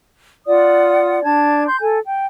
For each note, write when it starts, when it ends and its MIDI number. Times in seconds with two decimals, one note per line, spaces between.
0.46 1.22 65
0.46 1.22 74
0.46 1.22 78
0.46 1.22 87
1.24 1.66 62
1.24 1.66 81
1.24 1.66 92
1.67 1.80 84
1.67 1.80 91
1.81 1.99 69
1.81 1.99 80
2.06 2.27 79